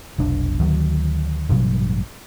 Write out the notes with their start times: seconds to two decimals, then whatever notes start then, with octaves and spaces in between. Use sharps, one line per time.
0.18 F1 B1 D4
0.60 D2 D#3 F#3
1.49 A1 G2 B2 F#3